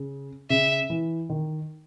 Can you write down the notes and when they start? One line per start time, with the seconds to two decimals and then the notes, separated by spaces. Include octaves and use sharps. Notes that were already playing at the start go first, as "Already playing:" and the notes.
Already playing: C#3
0.50 C#3 E5
0.90 E3
1.30 D#3